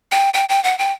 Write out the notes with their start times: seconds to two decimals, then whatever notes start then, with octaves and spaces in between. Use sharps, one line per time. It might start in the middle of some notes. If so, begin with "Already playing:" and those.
0.12 G5
0.34 G5
0.49 G5
0.64 F#5
0.79 G5